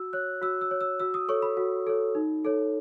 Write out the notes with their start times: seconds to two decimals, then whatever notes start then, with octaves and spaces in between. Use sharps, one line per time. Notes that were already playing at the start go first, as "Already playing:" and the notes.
Already playing: F#4 E6
0.13 C#5 F#6
0.42 F#4 E6
0.61 E6
0.71 C#5
0.81 E6
1.00 F#4 E6
1.14 D#6
1.28 A4 C#5 C#6
1.42 B5
1.57 F#4
1.87 A4 C#5
2.15 D#4
2.45 A4 C#5